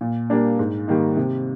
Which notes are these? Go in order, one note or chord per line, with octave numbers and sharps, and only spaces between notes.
A#2
G3 A#3 D4
G#2
D#3 G3 A#3 D#4
C3